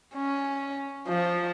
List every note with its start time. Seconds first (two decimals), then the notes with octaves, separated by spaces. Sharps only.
0.15 C#4
1.08 F3